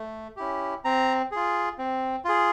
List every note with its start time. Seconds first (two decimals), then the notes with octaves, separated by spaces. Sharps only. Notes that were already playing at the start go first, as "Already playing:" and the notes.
Already playing: A3
0.36 C#4 E4 G4
0.85 C4 A#5
1.31 F4 G#4
1.78 C4
2.25 F4 G#4